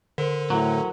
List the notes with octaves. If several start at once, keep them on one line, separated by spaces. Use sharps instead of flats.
D3 A#4 C5
A2 F#3